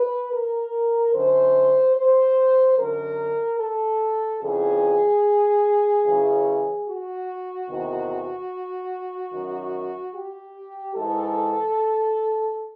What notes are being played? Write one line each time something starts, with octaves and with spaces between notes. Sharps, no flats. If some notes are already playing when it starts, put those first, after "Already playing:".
Already playing: B4
A#4
F#2 D3 C5
C5
F#2 D3 A#4
A4
F2 C#3 E3 G#4
F#2 C#3 E3
F#4
E2 C3 D#3
F#2 D#3
G4
G#2 E3 A4